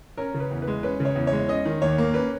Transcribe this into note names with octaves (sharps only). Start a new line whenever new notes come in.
C#4 A#4
C#3
B4
E2
B4
G#3
C#4 B4
C#3
C#5
E2
C#5
G#3
C#4 D#5
D#3
D#2 C#5
A#3
C#4 B4